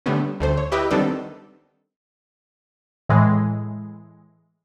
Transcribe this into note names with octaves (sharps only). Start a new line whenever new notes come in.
D3 G3 A3 B3 C#4
D2 A3 C5
C#5
E4 G4 B4 D#5 E5
D#3 G3 B3 C4 D4 A4
A2 E3 G#3